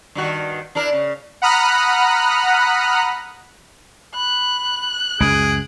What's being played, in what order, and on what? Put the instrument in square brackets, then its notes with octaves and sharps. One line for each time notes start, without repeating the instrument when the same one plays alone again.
[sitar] G2 D#3 F#4
D4 E4 A#4
C#3
[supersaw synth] F#5 A#5 B5 D#6 F6 F#6
[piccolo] B5 [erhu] F#6
[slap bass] C#2 F#2 [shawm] G#4 [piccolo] D7